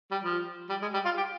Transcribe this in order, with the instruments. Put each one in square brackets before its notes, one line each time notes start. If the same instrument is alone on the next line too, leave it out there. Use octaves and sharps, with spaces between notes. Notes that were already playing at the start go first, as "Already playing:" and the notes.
[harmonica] G3
F3
G3
G#3
G3
F4
G4